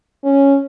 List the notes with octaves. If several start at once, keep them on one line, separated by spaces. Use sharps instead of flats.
C#4